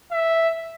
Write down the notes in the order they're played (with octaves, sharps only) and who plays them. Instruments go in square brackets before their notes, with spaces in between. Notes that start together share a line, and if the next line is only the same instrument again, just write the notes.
[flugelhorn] E5